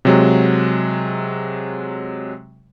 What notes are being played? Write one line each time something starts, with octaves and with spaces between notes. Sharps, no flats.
C3 F#3 G#3